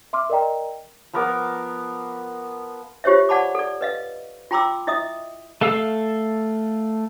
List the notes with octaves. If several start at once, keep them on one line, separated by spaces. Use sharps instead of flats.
E5 C6 D6 F6
A#4 D5 D#5 G5 A#5
F3 B3 A#4 D6
F4 G4 C5 C#5 E5
D5 F#5 A5 B5 D6
A4 D5
B4 D#5 F5
F4 G5 A#5 C6 D6 E6
E4 D#5 E5 D#6
A3 A4 F5 E6